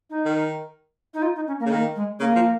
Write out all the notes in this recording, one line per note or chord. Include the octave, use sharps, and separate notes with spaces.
D#4
D#3
D#4
F4
D#4
C#4
A#3
C#3
D#3 A#3
G#3
C#3 A#3
F3